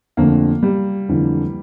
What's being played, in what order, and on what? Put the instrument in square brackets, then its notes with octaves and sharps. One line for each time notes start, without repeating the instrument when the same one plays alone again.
[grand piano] F2 D3 F3 A3 [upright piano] A#3
[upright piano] G3
[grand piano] F2 D3 F3 A3 [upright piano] E3